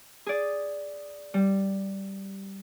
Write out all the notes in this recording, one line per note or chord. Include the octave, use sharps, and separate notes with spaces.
G#4 D5
G3